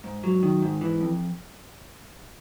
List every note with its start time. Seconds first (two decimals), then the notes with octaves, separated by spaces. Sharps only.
0.04 G#2
0.24 F#3
0.43 D#3
0.62 G#2
0.81 E3
1.01 F2